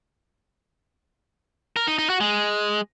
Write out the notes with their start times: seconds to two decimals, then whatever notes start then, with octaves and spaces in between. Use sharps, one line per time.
1.76 A#4
1.87 D#4
1.98 D#4
2.10 F#4
2.21 G#3